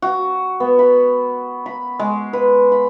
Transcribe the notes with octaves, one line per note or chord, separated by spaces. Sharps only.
F#4
B3
B5
B5
G#3
B4
B5